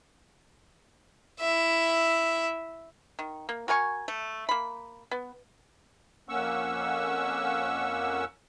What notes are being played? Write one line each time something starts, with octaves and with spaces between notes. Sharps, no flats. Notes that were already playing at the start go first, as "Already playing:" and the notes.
E4 E5
D#3
A#3
F#4 A#4 G#5 C#6
A3
A#3 B5
B3
F2 A#3 C#4 F#5 C#6 E6